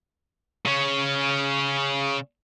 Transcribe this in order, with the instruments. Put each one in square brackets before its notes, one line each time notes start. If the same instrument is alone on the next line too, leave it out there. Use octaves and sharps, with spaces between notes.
[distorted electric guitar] C#3 C#4